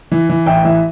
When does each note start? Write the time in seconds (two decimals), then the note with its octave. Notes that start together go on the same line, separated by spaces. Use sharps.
0.12 E3
0.30 E3
0.46 A1 E5 G5
0.65 E3 E5